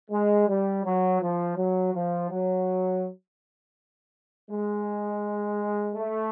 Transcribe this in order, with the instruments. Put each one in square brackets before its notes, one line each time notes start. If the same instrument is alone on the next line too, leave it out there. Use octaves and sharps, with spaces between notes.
[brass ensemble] G#3
G3
F#3
F3
F#3
F3
F#3
G#3
A3